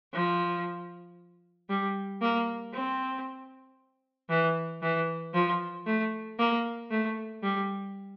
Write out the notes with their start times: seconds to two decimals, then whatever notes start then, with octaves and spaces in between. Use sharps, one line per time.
0.13 F3
1.69 G3
2.22 A#3
2.74 C4
4.30 E3
4.82 E3
5.34 F3
5.86 A3
6.39 A#3
6.91 A3
7.43 G3